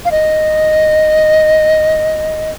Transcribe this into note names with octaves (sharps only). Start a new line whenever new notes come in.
F5
D#5